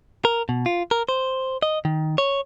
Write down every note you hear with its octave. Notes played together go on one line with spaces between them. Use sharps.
A#4
B2
F4
A#4
C5
D#5
D#3
C#5